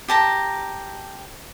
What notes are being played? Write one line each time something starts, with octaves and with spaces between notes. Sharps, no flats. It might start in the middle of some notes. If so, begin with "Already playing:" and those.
G4 A5 A#5